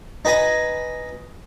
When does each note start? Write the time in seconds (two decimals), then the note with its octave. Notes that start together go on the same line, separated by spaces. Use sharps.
0.25 D#4 B4 G#5 A#5